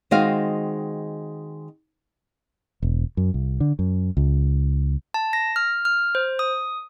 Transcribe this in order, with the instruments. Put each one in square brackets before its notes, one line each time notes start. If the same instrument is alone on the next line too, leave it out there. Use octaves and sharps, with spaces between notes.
[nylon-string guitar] D#3 G#3 C4 F#4 D#5 F5
[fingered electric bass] E1
F#2
C2
D3
F#2
C#2
[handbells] A5
A#6
F6
F6
C5
D#6